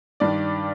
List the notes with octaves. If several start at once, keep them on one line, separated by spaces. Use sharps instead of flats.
G2 D#3 D4 D5